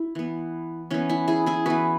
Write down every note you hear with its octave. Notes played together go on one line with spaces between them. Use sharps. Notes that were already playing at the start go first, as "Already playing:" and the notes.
Already playing: E4
E3 B3
E3 B3 C#4
E4
E4 G#4
E4 G#4
E3 B3 F#4 B4